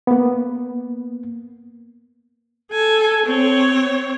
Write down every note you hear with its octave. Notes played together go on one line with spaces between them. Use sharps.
A#3 B3
A4 G#5
C4 C#5